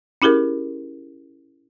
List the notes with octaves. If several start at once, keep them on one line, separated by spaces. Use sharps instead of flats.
C#4 E4 G4 G#4 A#4